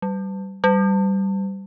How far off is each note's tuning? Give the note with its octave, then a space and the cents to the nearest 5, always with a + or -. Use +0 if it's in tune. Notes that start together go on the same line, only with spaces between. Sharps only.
G3 -25
G3 -15